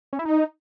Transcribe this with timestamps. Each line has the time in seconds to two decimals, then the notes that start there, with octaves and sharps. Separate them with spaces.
0.13 C#4
0.19 E4
0.25 D#4